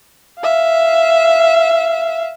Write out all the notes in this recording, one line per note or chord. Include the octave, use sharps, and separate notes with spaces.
E5 F5